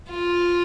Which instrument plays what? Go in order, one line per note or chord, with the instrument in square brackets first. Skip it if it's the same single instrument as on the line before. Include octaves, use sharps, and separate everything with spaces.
[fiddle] F4